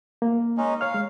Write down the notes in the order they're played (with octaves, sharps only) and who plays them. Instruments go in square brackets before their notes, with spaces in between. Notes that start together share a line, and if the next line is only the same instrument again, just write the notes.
[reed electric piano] A#3
[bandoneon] G#3 C#4 D#4
[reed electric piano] C#5 F6 [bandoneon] F5
[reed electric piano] G#3